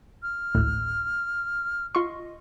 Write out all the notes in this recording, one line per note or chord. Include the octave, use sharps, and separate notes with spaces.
F6
G#1 D2 A2
F4 D#5 C6 C#6